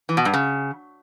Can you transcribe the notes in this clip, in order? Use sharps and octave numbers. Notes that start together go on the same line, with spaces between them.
E3
B2
G2
C#3